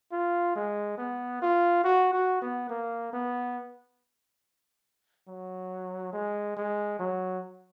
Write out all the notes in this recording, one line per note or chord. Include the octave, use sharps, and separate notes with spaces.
F4
G#3
B3
F4
F#4
F#4
B3
A#3
B3
F#3
G#3
G#3
F#3